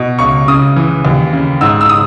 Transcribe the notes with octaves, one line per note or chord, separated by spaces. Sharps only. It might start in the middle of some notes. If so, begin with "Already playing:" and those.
Already playing: B2
C#2 C#6
C#3 D#6
E3
D#2
C#3
G#2 E6
E6
D#6